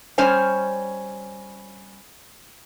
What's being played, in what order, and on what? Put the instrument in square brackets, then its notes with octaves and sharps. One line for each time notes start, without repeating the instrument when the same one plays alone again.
[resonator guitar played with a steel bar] G3 C#4 C5 C#5 G#5